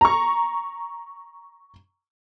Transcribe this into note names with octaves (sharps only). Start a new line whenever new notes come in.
A#5 C#6